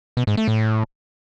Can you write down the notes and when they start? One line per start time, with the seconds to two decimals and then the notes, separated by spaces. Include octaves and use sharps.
0.17 B2
0.27 G#2
0.37 A3
0.48 A2